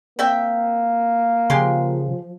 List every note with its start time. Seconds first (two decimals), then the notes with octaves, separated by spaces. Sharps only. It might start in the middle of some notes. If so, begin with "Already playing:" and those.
0.19 A#3 C4 E5 G5
1.50 C#3 F3 G#3 G4 C6